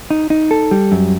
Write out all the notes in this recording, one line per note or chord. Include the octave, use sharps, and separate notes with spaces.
D#4
D#4
A4
G3
F#2